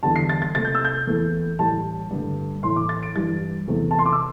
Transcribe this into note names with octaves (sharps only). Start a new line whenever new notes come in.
E2 D3 G3 A5
C7
A6
A6
C3 A3 A6
G6
E6
G6
E2 E3 A3
A2 E3 G3 A5
G2 D3 A3
A2 E3 A3 C6
D6
A6
D7
G2 E3 G3 A6
E2 C3 A3
A5
C6
D6
E6